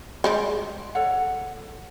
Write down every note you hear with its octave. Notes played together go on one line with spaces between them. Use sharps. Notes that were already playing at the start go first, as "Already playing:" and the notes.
G3 G#3 F#4 D5
A4 C#5 F#5